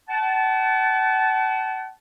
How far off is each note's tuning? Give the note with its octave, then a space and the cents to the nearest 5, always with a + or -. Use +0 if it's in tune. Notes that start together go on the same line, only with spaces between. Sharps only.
F#5 +35 A5 -20